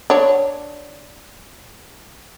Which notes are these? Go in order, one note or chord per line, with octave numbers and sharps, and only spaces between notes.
D4 C#5